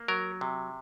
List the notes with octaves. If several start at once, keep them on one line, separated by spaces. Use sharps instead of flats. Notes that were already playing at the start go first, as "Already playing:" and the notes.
Already playing: A#3
F#3 A#4
C3